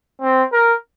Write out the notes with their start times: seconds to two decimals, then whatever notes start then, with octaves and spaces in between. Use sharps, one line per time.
0.21 C4
0.52 A#4